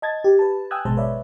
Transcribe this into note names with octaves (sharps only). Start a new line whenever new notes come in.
D#5 A5 G#6 A6
G4
B4 A5
G5 G#5 D#6 E6 F#6 G#6
G#1 B2 F#3 G#3 C5 A5
B4 C#5 D5 E5